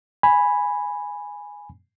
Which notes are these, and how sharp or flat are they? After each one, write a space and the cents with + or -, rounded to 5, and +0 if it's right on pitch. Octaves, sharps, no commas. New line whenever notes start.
G#5 -5 B5 +0